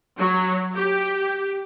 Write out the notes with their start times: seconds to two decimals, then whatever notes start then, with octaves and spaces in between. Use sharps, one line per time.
0.18 F#3
0.74 G4